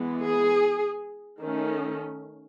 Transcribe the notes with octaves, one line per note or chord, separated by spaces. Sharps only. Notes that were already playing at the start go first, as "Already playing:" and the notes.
Already playing: E3 G#3 B3
G#4
D#3 A3 C#4